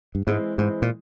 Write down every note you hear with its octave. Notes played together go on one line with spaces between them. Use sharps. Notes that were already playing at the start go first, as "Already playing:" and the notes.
G2
G#2 E3 G#3 C4 E4
G#2 E3 G#3 C4 E4
A#2